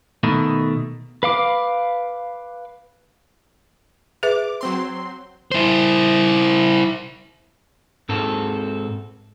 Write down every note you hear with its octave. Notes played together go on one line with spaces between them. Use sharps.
B2 D#3 A3
B4 F5 D6
G#4 B4 E5 D6
F#3 C4 C6
E4 C5
G#2 C4 A4